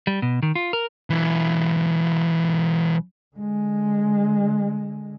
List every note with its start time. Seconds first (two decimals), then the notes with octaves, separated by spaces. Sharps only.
0.07 G3
0.22 B2
0.42 D#3
0.55 F4
0.73 A#4
1.10 B1 E3
3.36 D3 G#3